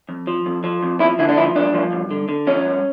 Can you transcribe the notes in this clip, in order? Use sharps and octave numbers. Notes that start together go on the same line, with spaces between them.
F2
F3
F2
F3
F2
F3 E4
D3 E4
D4
F3 E4
G2 D4
F3
G2
D3
D3
F3 C#4
G2